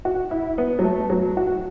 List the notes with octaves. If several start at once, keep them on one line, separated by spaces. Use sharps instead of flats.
F#4
E4
B3
F#3
A3
F#3
F#4